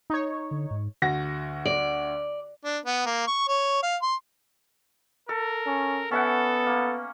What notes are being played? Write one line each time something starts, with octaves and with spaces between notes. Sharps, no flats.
D#4 C#5
D3
G#2
D2 F#4 A#6
D5
D4
B3
A#3
C#6
C#5
F5
C6
A4 A#4
C#4
B3 C#4 A4 E5 F#5
A#3